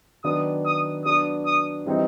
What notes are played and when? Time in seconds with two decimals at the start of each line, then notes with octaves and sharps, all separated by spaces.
0.24 D#3 F#3 B3 D4 D#6
0.65 D#6
1.05 F#3 B3 D4 D#6
1.46 D#6
1.86 E3 G3 C4 D#4